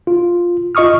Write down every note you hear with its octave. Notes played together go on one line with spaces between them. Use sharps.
F4
F4 D#5 C#6 D#6 F6